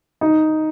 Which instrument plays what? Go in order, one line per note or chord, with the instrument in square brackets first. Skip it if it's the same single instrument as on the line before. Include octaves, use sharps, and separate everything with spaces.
[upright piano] D#4